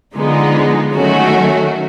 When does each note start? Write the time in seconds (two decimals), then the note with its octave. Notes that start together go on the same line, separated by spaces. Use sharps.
0.14 D3 F3 G#3 B3 D#4
0.95 D#3 F#3 A3 C#4 F#4